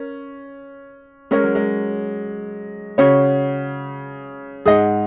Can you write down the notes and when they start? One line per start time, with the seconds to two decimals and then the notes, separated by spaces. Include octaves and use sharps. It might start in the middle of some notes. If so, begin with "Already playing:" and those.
Already playing: C#4 A#4
1.31 G#3 C#4 A#4 C#5
1.44 F#3
1.55 G#3
2.98 C#3 C#4 F#4 C#5
4.65 G#2 G#4 D#5 F#5